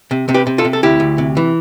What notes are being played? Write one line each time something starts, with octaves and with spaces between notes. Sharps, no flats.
C3
C3
G4 B4
C3
F4 A4
C3
A4
D2 E4 G4
D2
C3
E3